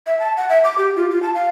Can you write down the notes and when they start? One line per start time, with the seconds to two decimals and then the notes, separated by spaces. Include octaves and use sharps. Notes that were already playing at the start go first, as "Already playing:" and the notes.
0.06 E5
0.20 A5
0.37 F#5
0.49 E5
0.64 D6
0.78 G4
0.96 F4
1.10 F4
1.22 A5
1.35 F5